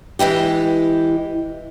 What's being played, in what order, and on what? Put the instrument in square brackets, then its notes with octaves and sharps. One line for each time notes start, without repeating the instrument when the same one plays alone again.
[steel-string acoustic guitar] E3 G#3 E4 G4